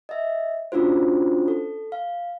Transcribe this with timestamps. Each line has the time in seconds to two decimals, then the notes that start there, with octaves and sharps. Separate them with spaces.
0.09 D#5 E5
0.72 C#4 D4 F4 F#4 C5
1.48 A4
1.92 F5